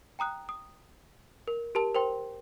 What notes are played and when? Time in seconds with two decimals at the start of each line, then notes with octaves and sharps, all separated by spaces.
0.19 G5 A#5 D#6 F#6
0.49 D#6
1.48 A#4
1.75 G4 A#4 A5
1.95 A#4 C5 G5 C6